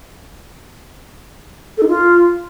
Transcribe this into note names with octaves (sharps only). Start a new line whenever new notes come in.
A4
D#4
F4